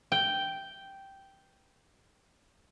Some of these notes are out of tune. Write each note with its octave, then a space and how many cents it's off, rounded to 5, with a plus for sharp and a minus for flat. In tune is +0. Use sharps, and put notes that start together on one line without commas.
G5 -5